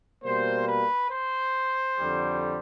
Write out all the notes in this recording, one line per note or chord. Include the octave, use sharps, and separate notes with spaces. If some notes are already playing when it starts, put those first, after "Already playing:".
B2 G3 A#3 C5
B4
C5
F2 D3 G3